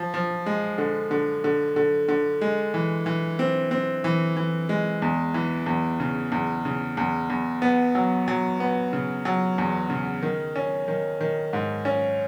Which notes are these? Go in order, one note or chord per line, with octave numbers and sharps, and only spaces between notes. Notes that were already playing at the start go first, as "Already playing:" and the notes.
Already playing: F3
F3
G#3
D3
D3
D3
D3
D3
G#3
E3
E3
C4
C4
E3
E3
G#3
E2
E3
E2
C#3
E2
C#3
E2
E2
B3
F#3
F#3
B3
C#3
F#3
E2
C#3
D#3
C#4
D#3
D#3
G#2
C#4